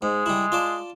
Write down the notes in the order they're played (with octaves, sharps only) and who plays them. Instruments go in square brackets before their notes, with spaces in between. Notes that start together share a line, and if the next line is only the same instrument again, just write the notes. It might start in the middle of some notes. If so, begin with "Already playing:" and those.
[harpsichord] G#2 [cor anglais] G#3
[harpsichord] G3 E4
F4 D5 A5